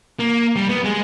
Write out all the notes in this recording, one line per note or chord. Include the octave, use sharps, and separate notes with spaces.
A#3
G3
B3
G#3